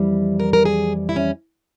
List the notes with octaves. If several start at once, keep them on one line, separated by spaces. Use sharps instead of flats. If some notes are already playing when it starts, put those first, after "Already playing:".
Already playing: F2 E3 G3
A#4
A#4
G#4
E4
C#4